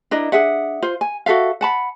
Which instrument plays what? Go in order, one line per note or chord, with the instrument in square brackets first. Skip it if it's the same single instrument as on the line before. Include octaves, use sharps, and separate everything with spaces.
[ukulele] D4 E4 A#4 D#5
D4 G#4 E5 F#5
F4 C5
G#5
F#4 A4 E5 F5
F#5 A5 B5